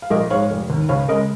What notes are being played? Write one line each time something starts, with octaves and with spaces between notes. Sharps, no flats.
F5
A#1 A#4 D#5
G#2 G#3 C#5 F5
F1
D#2 D#3
C#2 C#5 F5
C#3 G#3 A#4 D#5